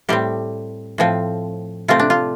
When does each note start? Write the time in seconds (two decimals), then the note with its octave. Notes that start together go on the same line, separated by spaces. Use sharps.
0.09 A2 G3 C4 G4
0.98 A2 F3 C4
1.88 C3 A3 C4 F4
1.99 D4
2.10 F4